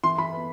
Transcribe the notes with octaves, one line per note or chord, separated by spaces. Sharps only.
E3 C6
E3 B5
B3